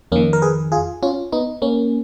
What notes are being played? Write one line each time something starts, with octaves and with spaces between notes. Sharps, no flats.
F2 D#3 A#3 C#4
A#4
G#4 B4
F4 G#4
C#4 F4
B3 D#4
A#3 C#4